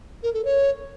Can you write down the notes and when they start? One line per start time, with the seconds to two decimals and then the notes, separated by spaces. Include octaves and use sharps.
0.23 A#4
0.34 A4
0.45 C#5